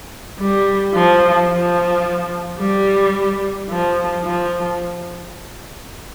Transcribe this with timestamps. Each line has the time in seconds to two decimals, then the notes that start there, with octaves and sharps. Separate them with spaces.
0.39 G3
0.94 F3
1.50 F3
2.59 G3
3.69 F3
4.24 F3